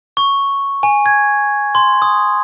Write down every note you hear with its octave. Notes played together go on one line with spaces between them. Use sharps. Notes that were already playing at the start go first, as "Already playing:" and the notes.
C#6
G#5
G#6
C6
D#6